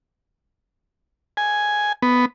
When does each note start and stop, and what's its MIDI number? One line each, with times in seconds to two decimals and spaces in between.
1.37 1.92 80
2.02 2.25 59